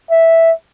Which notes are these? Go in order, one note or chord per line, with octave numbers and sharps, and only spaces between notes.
E5